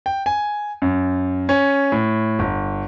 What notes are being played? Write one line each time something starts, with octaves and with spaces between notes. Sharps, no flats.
G5
G#5
F#2
C#4
A2
G1